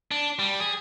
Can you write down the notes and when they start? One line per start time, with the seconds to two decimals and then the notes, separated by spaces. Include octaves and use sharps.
0.11 D4
0.39 G3
0.60 G#4